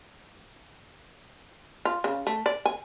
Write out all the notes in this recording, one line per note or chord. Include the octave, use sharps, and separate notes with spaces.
F4
C#3
A3
D5
G#5